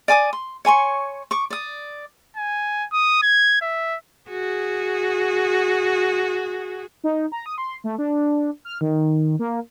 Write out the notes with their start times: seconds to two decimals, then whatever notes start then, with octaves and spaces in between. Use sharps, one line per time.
0.08 D5 G#5 D6 D#6
0.33 C6
0.65 C#5 G#5 C6 C#6
1.31 C#6 D6
1.50 D5 D#6
2.37 G#5
2.93 D#6
3.23 G#6
3.62 E5
4.29 F#4 G#4
7.04 D#4
7.32 A#5
7.46 D#6
7.58 C6
7.84 A3
7.98 D4
8.65 F6
8.81 D#3
9.39 A#3